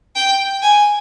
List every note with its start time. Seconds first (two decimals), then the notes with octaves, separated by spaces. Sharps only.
0.16 G5
0.62 G#5